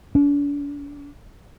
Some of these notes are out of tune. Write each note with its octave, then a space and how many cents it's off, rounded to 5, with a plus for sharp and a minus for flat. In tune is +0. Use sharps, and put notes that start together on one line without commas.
D4 -40